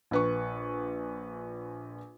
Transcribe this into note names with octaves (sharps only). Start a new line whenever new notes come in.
A#1 B4 C#6